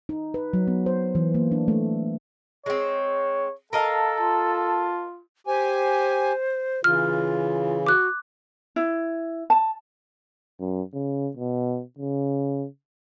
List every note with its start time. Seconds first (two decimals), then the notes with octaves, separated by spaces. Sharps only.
0.09 D#4
0.34 B4
0.53 F#3
0.67 B3
0.86 C5
1.15 E3
1.34 A#3
1.52 D4
1.68 A3
2.66 G#3 C4 C#5
3.73 A4 A#4 D#5 F5 A5
4.20 F4
5.47 G4 C5 G#5
6.84 C#3 E3 F4 F6
7.87 F#4 D6 F#6
8.76 E4
9.50 A5
10.60 F#2
10.93 C#3
11.37 B2
11.99 C#3